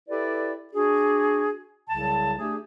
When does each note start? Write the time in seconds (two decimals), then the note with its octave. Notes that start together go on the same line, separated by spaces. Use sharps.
0.09 E4 G4 A4 B4 D5
0.74 D4 F#4 G#4
1.90 C2 C#3 F#3 A5
2.38 A3 D4 G4 G#4